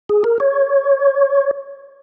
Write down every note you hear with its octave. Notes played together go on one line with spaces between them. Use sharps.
G#4
A#4
C#5